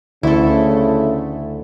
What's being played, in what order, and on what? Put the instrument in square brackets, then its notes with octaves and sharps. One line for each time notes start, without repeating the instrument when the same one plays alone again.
[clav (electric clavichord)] D2 [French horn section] C#3 A3 [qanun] E4 A4